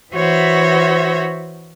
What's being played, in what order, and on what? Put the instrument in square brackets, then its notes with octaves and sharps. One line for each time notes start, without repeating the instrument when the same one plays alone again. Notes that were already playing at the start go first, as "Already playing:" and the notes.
[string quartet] E3 F#4 C5 C#5 E5